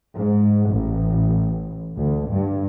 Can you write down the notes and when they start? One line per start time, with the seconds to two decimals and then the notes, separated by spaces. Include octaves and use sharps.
0.17 G#2
0.69 A1
1.97 D2
2.32 G2